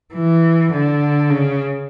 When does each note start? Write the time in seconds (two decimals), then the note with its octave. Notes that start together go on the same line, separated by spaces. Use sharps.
0.14 E3
0.72 D3
1.30 C#3